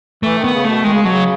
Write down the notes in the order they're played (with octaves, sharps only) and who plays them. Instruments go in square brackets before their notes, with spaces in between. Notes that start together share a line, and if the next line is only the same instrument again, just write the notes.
[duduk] E3 [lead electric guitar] A3
[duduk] D#3
[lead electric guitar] B3
[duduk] C#3
[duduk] B2 [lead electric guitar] A3
[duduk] D#3 [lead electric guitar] G#3
[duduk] C#3
[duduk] B2 [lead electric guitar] F#3
[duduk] C#3